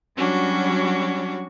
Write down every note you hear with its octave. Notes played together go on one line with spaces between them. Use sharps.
F#3 G3 C#4 D4 F#4